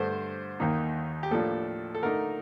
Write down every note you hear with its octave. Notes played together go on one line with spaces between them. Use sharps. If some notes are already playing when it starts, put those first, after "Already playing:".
Already playing: G2 D3 A3 C5
D#2 D#3 A#3 D#4
G4
A2 F3 A#3 D4 A4
A4
D3 A3 D#4 A#4